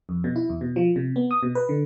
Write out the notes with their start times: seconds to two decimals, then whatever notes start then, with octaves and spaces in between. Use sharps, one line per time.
0.09 F2
0.24 B2
0.36 E4
0.49 E2
0.61 B2
0.76 F3
0.96 C3
1.16 B3
1.31 D#6
1.43 B2
1.55 B4
1.69 D3